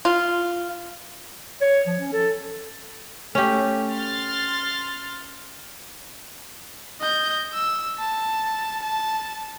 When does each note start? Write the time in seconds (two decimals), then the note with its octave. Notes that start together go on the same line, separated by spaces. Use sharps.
0.05 F4
1.62 C#5
1.87 F3
1.99 C#4
2.13 A4
3.35 A3 C#4 G4
3.92 C6 F6 A6
7.00 D#5 G6
7.53 E6
7.99 A5
8.82 A5